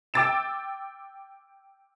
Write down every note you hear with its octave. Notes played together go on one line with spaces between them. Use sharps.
G5 D6 E6 A6 D7 E7